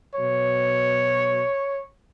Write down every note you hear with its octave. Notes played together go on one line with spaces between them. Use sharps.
B2 F#3 C#5